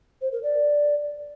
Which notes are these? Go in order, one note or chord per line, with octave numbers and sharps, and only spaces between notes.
C5
A#4
D5